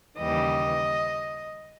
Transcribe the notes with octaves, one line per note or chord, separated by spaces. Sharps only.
D#2 C#3 E3 G3 D#5